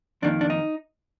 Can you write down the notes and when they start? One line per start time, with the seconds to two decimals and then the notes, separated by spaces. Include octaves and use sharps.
0.22 F2 D#3 A#3 D4
0.41 D4
0.50 D#4